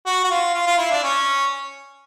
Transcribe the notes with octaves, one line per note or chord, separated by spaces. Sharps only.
F#4
F#4
F4
F4
F4
E4
D4
C#4